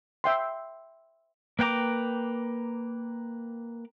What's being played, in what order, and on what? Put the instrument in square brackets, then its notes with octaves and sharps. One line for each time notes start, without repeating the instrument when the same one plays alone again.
[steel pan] E5 G5 C6
[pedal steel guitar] A#3 B4 G5 A#5 D6